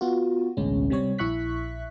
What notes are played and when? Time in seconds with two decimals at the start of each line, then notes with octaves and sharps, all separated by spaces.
0.01 B3 F4 F#4
0.57 A1 D2 B2 G#3 C#4
0.90 C3 G3 C4 C#5
1.19 A#1 E4 E5 C#6 F#6 B6